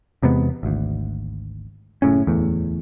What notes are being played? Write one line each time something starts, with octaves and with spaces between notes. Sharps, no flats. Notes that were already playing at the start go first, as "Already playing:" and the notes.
E2 C3 G#3 B3
G#1 D2
F#1 A2 C#3 C#4
D1 E2 A2